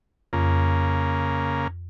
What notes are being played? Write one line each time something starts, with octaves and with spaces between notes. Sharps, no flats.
F2 C#3 A#3